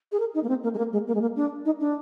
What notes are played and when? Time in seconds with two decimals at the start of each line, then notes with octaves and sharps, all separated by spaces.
0.12 G#4
0.19 A#4
0.34 D#4
0.43 A#3
0.49 C4
0.63 A#3
0.74 G#3
0.78 A#3
0.92 G#3
1.07 A#3
1.15 G#3
1.21 A#3
1.36 D4
1.65 D#4
1.80 D4